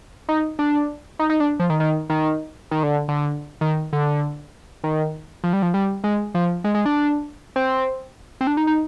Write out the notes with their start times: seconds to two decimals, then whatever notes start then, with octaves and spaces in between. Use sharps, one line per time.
0.29 D#4
0.59 D4
1.19 D#4
1.30 D#4
1.40 D4
1.60 F3
1.70 D#3
1.80 D#3
2.10 D#3
2.71 D#3
2.83 D3
3.08 D3
3.61 D#3
3.93 D3
4.84 D#3
5.44 F3
5.53 G3
5.62 F3
5.74 G3
6.04 G#3
6.35 F3
6.64 G#3
6.74 G#3
6.86 D4
7.56 C4
8.41 C4
8.47 D4
8.57 D#4
8.67 D#4